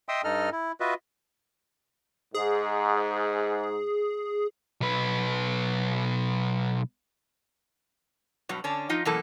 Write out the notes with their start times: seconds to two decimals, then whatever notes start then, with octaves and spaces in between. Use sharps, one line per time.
0.09 D#5 E5 G5 C6 D#6 E6
0.24 G2 D#4 A4 D#5 F6
0.52 E4
0.80 F4 F#4 B4 D#5 E5
2.34 G#2 G#4
4.81 B1 B4
8.49 G2 B2 F#3
8.64 D3 C#4 D4
8.89 F3 D#4 F4 D#5
9.05 F#2 B2 E3 A#3 A4